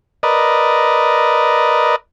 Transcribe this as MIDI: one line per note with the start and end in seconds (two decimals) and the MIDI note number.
0.23 1.96 70
0.23 1.96 71
0.23 1.96 74
0.23 1.96 75